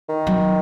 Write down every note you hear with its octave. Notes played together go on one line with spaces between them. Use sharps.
D#3
F#3